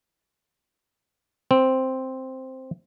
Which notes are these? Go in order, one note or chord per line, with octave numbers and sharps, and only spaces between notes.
C4